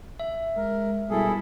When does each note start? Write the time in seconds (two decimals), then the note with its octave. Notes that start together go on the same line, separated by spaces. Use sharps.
0.20 E5
0.57 G#3 A#4
1.10 B2 G3 E4 G#4 A4